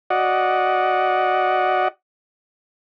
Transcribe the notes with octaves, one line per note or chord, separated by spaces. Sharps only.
F#4 D5 D#5 F#5